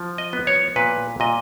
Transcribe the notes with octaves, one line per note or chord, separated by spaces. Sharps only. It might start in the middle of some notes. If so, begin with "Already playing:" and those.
Already playing: F3
D#5
B3
C#5
A#2 B4
A#2 D#5